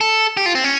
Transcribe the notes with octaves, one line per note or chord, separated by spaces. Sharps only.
A4
G4
F4
C4
C#4